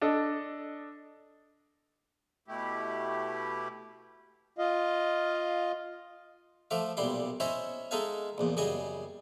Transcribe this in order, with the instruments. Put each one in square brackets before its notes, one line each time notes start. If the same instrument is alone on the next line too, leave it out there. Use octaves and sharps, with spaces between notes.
[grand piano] D4 A4 D#5
[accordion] B2 A3 E4 G4
[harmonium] F4 D#5 F5
[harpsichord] F3 A3 E5 F5 D6
B1 A#2 G3 E4 C6 D6
C#4 E4 C5 C#5 D#5 E5
G#3 D#4 A4 E5 F5 G#5
A#1 E2 A#2
F#2 C#3 G3 G#4 D#5 G#5